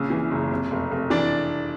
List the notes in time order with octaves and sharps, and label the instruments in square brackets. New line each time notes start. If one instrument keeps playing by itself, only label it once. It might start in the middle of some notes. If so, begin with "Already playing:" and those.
Already playing: [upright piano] A#1 C#3
E3
F#1
C3
F1
F1
[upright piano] E3 [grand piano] D4 D5